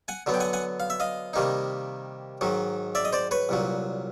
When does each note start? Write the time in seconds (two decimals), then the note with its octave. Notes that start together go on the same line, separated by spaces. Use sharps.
0.08 F#5 G#5
0.26 D3 F#3 B3
0.34 G5
0.40 F#5 G#5
0.53 F#5 G#5
0.80 F5
0.90 E5
1.00 D#5 F5
1.33 C3 D#3 G3 A#3 D#4
2.41 G#2 D#3 F#3
2.95 D5 E5
3.05 D#5
3.13 C5 D5
3.31 B4 C#5
3.49 C2 A#2 F#3